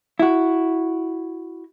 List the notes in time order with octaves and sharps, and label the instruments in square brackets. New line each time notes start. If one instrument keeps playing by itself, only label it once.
[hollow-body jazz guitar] E4 F#4